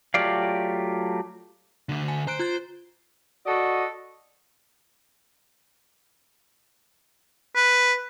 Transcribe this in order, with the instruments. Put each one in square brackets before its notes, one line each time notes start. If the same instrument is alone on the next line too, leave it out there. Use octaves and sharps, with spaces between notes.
[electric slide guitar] F#3 A3 F4 G4 D5 F5
[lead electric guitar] D2 D3
[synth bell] G#5
[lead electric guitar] C5 [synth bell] A#5 F#6 D7
[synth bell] F4 F#6 A6
[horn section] F#4 A4 D5 D#5
[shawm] B4